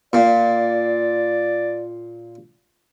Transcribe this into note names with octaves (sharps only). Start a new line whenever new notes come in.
A#2 D5